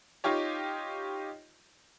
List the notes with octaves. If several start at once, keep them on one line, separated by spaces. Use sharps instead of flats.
D#4 F4 G4 C#5